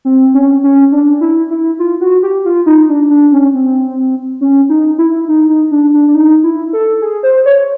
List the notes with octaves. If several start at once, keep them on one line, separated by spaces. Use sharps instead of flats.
C4
C#4
C#4
D4
E4
E4
F4
F#4
G4
F4
D#4
D4
D4
C#4
C4
C#4
D#4
E4
D#4
D#4
D4
D4
D4
D#4
E4
A4
G#4
C5
C#5